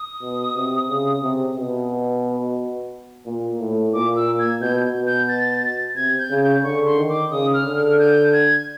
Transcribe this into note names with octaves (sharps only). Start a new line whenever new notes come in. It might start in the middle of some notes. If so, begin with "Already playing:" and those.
Already playing: D#6
B2
C3
C#3
C3
B2
A#2
A2
A#2 D6
E6
G#6
B2 G6
B2
G6
A6
C3 G#6
G6
C#3
G6
D3 C#6
C6
D#3
D6
C#3 D#6
F6
D3
F6
G6
G#6